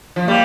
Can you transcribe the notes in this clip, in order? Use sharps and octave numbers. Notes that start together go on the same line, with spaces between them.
F3
G3 A#3